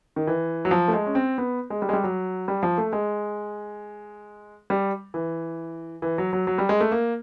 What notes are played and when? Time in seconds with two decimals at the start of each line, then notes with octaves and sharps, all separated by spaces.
0.16 D#3
0.27 E3
0.65 F#3
0.71 F3
0.88 A3
0.93 G#3
1.06 C#4
1.15 C4
1.38 B3
1.70 G#3
1.82 G3
1.89 G#3
1.93 G3
2.04 F#3
2.48 G3
2.63 F3
2.78 A3
2.93 G#3
4.70 G3
5.14 E3
6.02 E3
6.18 F#3
6.33 F#3
6.47 F#3
6.58 G3
6.69 G#3
6.81 A3
6.92 A#3